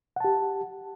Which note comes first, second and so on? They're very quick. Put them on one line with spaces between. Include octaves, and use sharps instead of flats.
F#5 A5 G4